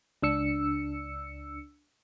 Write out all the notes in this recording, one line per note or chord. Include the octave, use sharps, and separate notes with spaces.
C#2 D4 E6 C#7